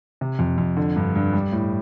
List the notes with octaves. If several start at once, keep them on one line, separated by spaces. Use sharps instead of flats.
C3
F2
F2
D3
G2
G2
G3
A2